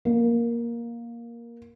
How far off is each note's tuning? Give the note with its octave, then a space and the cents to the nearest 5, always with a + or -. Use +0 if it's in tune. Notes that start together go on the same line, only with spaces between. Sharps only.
A#3 +10